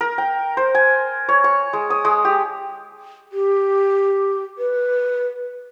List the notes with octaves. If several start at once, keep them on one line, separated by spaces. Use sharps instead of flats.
A#4
G5
C5
G#5
C#5
C#6
G#3
D#6
G#3
G4
G4
B4